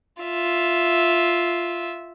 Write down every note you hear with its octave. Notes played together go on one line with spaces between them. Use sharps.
F4 E5